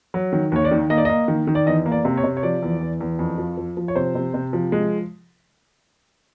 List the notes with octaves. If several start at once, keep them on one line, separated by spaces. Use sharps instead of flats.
F#3
D#3
D#2 C#5
D5
D#3
A#3 D#5
D5
A#3 D#5
D#3
D#3
D5
E2 D#5
A#3
D5
C3
C#5
C3
C#5
F3 D5
E2
E2
E2
F2
F3
F3
F3
C#5
C3 C5
C3
C3
F3
G#3